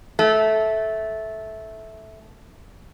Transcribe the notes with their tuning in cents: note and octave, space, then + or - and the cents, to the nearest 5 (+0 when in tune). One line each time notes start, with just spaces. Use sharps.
A3 -10